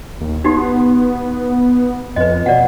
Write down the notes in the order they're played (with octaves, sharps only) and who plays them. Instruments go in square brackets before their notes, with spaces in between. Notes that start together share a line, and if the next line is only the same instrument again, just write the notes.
[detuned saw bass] D#2
[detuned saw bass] B3 [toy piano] D#4 F#4 G4
[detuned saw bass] F2 [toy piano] B4 D#5
[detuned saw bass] B2 [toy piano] D5 F#5